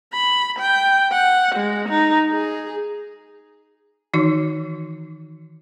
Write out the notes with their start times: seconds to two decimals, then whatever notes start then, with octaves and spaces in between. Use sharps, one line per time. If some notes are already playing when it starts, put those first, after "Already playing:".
0.13 B5
0.59 G5
1.12 F#5
1.56 G#3
1.89 D#4
2.31 G#4
4.14 D#3 E3 D#4 F#4 C#5